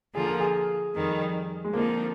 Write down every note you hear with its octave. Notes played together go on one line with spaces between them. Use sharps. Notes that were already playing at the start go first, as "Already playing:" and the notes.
D3 F3 A#3 F4 G#4
A#4
G#4
F2 D#3 G3
G#3
D3 F3 A#3 C4 D#4